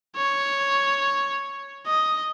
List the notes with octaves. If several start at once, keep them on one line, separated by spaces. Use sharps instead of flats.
C#5
D#5